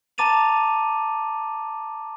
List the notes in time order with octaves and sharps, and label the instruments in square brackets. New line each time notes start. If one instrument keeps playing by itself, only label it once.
[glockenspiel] A5 A#5 D6 A6 D#7 F7